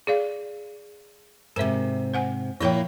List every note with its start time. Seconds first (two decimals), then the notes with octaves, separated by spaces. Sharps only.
0.07 G#4 D5 F5
1.56 G#2 C3 A#4 E5
2.14 C5 F#5 G#5
2.60 A#2 F3 A#3 E4 C#5 G5